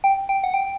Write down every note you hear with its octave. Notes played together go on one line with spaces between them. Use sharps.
G5
G5
F#5
G5